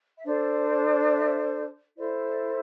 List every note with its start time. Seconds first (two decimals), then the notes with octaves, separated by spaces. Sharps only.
0.15 E5
0.24 D4 A4 C5 D5
1.10 E5
1.96 E4 A4 C5 D5
2.25 D5